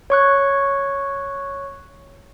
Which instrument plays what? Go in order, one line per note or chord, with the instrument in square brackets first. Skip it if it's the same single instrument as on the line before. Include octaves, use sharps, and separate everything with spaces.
[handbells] C#5 C#6 F#6